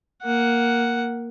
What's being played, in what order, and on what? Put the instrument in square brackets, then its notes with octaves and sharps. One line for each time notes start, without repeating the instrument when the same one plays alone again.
[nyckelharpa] A#3 F#5